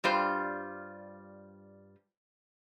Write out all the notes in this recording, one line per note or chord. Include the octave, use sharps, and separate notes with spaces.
G2 G3 F4 C5